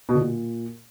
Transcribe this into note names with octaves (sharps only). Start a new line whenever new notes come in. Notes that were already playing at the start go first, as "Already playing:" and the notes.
B2
D3
A#2